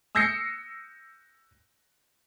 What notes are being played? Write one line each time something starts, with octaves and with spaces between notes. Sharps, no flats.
D#6 E6 G6 A#6 C7 C#7